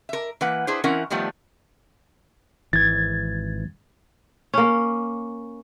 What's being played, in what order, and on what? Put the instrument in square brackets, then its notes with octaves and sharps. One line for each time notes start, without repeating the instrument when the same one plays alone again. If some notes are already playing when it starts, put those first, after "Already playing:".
[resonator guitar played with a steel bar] A#4 E5
E3 A#3 B4 F#5
D4 E4 G#4 B4 C5
E3 C4 C#4 E4 A#4 F#5
D#3 F3 G3 A3 B3
[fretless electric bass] G#1 E3 [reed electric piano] G#6 A6
[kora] A#3 C#4